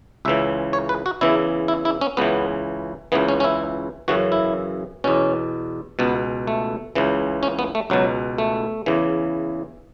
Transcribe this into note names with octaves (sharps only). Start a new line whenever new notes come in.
C#2 C#3 E3 E5
C#5
B4
F#4
E2 C#3 E3 E4
E4
E4
C#4
C#2 C#3 E3 B3
C#2 C#3 E3 B3
C#4
C#4
E4
F#2 C#3 E3 F#4
E4
E2 B2 C#4
C#2 B2 B3
A3
C#2 C#3 E3
C#4
B3
A3
C#2 B2 F#3
A3
E2 C#3 E3